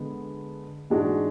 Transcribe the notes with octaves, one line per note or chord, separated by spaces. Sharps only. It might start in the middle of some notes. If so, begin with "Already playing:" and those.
Already playing: D3 G#3 B3
G#2 E3 G#3 D4 F#4